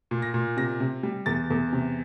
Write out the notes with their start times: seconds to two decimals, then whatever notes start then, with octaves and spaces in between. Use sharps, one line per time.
0.11 A#2
0.22 A#6
0.34 A#2
0.57 C3 A#6
0.80 C3
1.03 G3
1.26 E2 A6
1.50 E2
1.73 C3